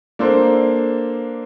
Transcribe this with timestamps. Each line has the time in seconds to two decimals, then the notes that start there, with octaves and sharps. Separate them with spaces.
0.19 A#3 D4 A4 C5